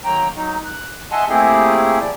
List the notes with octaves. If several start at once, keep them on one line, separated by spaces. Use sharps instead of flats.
D#3 F#3 A#3 G5 A#5
F#3 D#4
F#6
D#5 E5 F#5 G#5 A5 C6
A3 A#3 C4 E4 G4 G#4
F3 D5